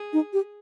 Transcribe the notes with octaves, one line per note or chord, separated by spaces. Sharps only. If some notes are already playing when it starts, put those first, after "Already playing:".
Already playing: G#4
D#4
G4